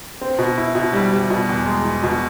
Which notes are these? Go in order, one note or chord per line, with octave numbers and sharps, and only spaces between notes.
C4
B2
E4
B2
G3
G3
B2
E2
G#3
E2
B2